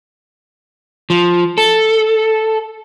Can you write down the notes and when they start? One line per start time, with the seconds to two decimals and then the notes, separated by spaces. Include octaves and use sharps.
1.10 F3
1.58 A4